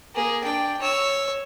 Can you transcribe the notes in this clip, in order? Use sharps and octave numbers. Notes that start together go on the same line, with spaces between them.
A#3 G#4
D4 G5
C#5 E6